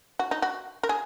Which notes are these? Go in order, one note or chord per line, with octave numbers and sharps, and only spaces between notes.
F#4
D#4
F#4
A#4
G#4